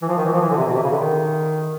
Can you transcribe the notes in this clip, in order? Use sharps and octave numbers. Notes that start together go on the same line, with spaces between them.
E3
F3
D#3
E3
F3
E3
D3
C3
B2
C3
C#3
D3
D#3